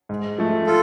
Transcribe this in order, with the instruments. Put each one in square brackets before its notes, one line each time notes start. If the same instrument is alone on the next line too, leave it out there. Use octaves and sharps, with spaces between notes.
[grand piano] G#2
F3 A3
[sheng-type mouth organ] F4 A4